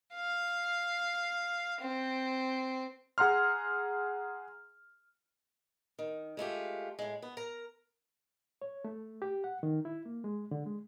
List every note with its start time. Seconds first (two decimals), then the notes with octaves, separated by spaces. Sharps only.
0.14 F5
1.81 C4
3.18 G#4 F#5 A#5 C6 F6
5.99 D#3
6.37 G#3 A3 F4 G4
6.99 A2 G#3
7.22 B3
7.37 A#4 A#5
8.62 C#5
8.84 A3
9.22 G4
9.44 F#5
9.63 D#3
9.85 E4
10.06 A#3
10.24 G#3
10.51 D3
10.66 G#3